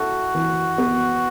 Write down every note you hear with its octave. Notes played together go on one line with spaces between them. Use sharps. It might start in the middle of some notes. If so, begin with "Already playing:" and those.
Already playing: E4 F#4 A4
E3
B3